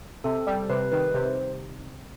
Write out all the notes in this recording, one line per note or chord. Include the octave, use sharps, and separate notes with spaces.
C3 A4
G3
C3 B4
D#3 B4
C3 C5